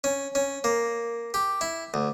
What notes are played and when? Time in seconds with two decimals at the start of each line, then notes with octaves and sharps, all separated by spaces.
0.04 C#4
0.35 C#4
0.64 A#3
1.34 G4
1.61 E4
1.94 D2